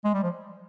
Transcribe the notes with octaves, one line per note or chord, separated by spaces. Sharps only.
G#3
G3
F3